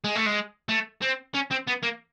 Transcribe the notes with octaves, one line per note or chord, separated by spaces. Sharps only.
G#3
A3
G#3
A3
C4
C#4
C4
B3
A#3